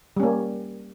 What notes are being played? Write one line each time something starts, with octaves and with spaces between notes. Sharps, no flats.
G3 A#3 C#4